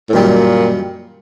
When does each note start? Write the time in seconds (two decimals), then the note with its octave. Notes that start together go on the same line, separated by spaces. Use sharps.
0.09 A2
0.13 F#2 A#2 D#3 G3